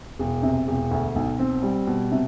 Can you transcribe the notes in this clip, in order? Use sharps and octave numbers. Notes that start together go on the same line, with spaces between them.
E1
C3
E1
D2
B1
C4
G3
B2
C3